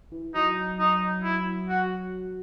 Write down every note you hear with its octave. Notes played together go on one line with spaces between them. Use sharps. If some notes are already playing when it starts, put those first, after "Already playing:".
E3
F#3 D#4
D#4
E4
F#4